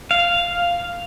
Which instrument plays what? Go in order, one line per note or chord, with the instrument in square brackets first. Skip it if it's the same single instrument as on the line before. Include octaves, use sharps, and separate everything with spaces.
[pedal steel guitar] F5